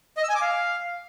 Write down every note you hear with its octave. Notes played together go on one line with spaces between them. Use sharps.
D#5
E6
G#5
D6
F5